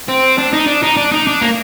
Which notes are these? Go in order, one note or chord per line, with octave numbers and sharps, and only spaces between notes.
C4
D4
D#4
D4
D#4
D4
D#4
D4
A#3